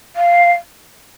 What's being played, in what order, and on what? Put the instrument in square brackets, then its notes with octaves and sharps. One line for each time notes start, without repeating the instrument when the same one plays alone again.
[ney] F5